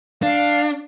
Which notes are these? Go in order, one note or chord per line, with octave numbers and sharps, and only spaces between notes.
D4 F5